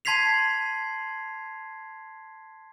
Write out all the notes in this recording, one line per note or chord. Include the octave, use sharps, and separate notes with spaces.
A5 C6 G#6 B6 C7 F7